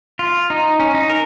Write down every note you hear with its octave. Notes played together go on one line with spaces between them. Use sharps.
F4
D#4
C#4
D#4
A#4